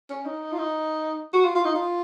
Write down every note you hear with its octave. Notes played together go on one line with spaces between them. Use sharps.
C#4
D#4
F4
D#4
F#4
F4
F4
D#4
F4